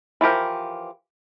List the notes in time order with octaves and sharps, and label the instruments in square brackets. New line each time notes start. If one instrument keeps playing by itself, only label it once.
[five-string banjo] E3 F3 G4 A#4